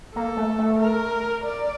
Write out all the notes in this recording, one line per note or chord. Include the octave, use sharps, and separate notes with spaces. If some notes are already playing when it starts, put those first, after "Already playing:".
A#3 A4
A3
A3
A#4
D5